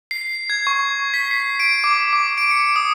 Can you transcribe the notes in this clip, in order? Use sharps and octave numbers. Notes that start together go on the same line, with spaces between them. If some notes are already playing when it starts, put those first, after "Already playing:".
C7
G#6
C#6
B6
C7
D7
D6
D6
D7
C#7
D#6